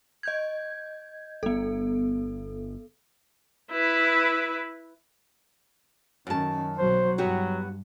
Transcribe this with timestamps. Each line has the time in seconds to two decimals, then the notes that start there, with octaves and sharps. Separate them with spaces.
0.23 D#5 G6 G#6
1.43 G1 B3 A4
3.72 E4 B4
6.27 F#2 D#3 C#4 A5
6.78 B1 F#3 C5
7.18 G2 F#3 B3 F#4 G4